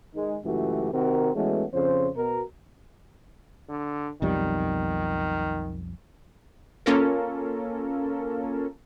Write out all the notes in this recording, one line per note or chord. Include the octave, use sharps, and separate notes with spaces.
D#3 G#3 D#4
C#2 F#2 E3 A3 F#4 G4
C3 D#3 C4 F#4 A#4
E3 G#3 A3 B3 C#4 F#4
F2 C#3 C5
B2 A#4
D3
B1 F2 D#3 G3
A#3 C#4 F4 A4 A#4